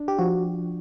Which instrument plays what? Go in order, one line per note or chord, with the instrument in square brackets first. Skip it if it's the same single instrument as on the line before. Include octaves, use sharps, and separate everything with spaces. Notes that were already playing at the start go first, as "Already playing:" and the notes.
Already playing: [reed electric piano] D4
[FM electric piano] G4
[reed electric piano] F3 [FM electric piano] F#4